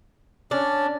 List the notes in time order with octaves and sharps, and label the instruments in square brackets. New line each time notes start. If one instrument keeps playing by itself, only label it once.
[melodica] C#4 [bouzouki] D4